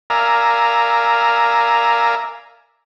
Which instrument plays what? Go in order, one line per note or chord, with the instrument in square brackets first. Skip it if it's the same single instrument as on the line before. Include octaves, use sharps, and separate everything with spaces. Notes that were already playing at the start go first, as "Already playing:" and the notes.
[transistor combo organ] A#4 D5 E5 F5 G#5 A#5